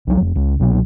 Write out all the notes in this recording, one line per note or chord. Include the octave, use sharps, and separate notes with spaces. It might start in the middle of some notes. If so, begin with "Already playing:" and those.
C2 F#3
F1
C#2
C2 B2 F#3